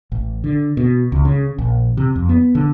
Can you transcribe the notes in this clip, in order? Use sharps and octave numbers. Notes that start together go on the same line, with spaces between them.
A1
D3
B2
C#2
C#3
A#1
C3
F2
B3
D3